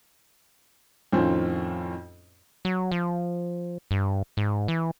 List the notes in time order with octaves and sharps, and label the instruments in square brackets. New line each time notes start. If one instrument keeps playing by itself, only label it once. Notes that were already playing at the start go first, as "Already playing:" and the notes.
[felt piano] F2 A2 D#3 C4 C#4 F4
[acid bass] F#3
F3
G2
G#2
E3